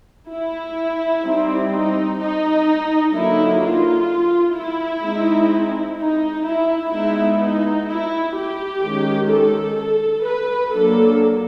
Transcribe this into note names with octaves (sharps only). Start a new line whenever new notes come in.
E4
G3 C4 D#4
D#4
D#4
D3 F#3 A#3 D#4 E4
F4
E4
G#3 C4 D#4
D#4
E4
G#3 B3 D#4 E4
D#4
E4
G4
D#3 G#3 C#4
A4
A4
B4
F#3 A#3 D4 A4